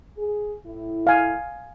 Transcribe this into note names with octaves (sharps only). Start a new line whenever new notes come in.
G#4
A2 E4
F5 G#5